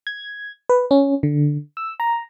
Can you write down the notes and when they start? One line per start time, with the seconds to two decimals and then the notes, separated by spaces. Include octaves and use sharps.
0.07 G#6
0.69 B4
0.91 C#4
1.23 D3
1.77 E6
2.00 A#5